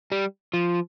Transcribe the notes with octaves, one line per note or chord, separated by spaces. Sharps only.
G3
F3